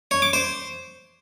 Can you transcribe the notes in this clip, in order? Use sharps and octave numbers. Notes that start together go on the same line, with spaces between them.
C#5
D6
C5